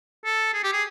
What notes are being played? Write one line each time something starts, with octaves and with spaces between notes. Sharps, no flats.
A4
G#4
G4
G#4